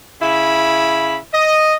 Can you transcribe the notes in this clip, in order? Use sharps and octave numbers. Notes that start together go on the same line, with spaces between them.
C#3 E4 B5
D#5